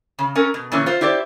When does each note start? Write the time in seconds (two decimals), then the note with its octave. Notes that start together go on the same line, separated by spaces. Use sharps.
0.19 C#3
0.35 C#4 A4 A#4
0.54 B2
0.72 A#2 D3 E3 C#4
0.86 F4 C5
1.01 E4 G4 C5 D5